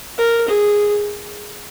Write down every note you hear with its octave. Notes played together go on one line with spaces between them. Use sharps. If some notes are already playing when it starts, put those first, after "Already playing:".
A#4
G#4